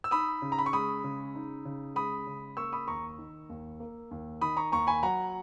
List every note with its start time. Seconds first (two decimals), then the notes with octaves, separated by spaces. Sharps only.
0.04 E6
0.11 D#4 B5 D#6
0.42 C#3
0.52 A#5
0.58 B5
0.66 C#6
0.73 G#3 B5 D#6
1.04 C#3
1.35 D#4
1.65 C#3
1.95 G#3 B5 D#6
2.27 C#3
2.57 A#3 C#6 E6
2.73 B5 D#6
2.88 D#2 A#5 C#6
3.18 D#3
3.49 D#2
3.80 A#3
4.11 D#2
4.41 D#3 B5 D#6
4.57 A#5 C#6
4.72 D#2 A#5 C#6
4.87 G#5 B5
5.03 F#3 F#5 A#5